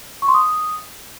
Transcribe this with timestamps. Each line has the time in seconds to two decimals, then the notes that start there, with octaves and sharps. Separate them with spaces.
0.22 C#6
0.28 C6
0.34 D#6